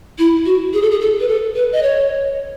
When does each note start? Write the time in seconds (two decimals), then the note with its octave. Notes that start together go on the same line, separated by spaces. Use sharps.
0.19 E4
0.45 F#4
0.73 G#4
0.82 A4
0.91 G#4
1.01 A4
1.20 B4
1.28 A4
1.56 B4
1.73 D#5
1.83 C#5